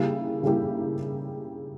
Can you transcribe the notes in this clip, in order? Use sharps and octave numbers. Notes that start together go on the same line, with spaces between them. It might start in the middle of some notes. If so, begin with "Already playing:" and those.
Already playing: C#3 G3 A#3 E4 G4
C#3 G3 A#3 E4 G4